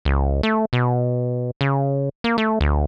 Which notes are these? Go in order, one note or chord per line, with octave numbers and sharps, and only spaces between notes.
C#2
A3
B2
C#3
A#3
A3
D2